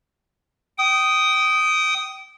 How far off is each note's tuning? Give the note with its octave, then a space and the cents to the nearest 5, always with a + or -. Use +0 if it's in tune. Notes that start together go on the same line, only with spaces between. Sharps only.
G5 -25 D#6 +0